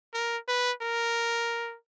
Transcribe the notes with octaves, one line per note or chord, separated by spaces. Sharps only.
A#4
B4
A#4